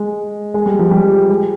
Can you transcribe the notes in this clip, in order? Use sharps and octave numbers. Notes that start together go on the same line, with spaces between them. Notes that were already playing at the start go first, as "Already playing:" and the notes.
Already playing: G#3
G#3
G3
F3
G3
G#3